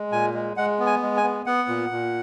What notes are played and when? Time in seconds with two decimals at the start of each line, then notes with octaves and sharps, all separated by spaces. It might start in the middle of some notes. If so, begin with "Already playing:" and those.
Already playing: G#3
0.12 A#2 G#5
0.34 G#3
0.57 G#3 F#5
0.79 B3
0.86 G#5
1.02 G#3
1.17 G#5
1.24 B3
1.46 B3 F#5
1.68 A#2
1.91 A#2